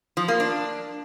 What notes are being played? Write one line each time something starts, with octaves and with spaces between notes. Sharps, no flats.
F3
A#3
D4